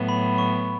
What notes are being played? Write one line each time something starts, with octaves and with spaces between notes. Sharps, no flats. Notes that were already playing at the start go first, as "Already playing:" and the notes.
Already playing: A2 F#3 B3
B5
C#6